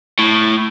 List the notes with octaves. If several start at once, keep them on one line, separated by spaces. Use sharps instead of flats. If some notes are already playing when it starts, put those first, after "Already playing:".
A2